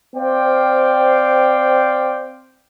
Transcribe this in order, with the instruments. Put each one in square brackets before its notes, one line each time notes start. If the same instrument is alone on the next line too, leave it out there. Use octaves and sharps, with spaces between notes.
[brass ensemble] C4 C5 D5 F5 G5